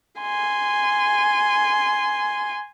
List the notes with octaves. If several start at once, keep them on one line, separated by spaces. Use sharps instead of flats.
G#5 C6